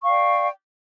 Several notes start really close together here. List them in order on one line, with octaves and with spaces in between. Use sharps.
C#6 F5 D5 G5